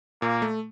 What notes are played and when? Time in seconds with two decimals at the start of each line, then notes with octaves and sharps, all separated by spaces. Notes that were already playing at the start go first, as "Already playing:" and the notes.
0.22 A#2 A#3
0.42 A3